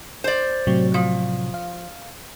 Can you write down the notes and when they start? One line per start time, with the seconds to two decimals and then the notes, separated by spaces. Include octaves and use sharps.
0.24 C5 D5
0.67 A2 C3 F#3
0.94 F3
1.54 F5